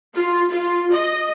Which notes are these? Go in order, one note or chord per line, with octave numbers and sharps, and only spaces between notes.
F4
F4
D#5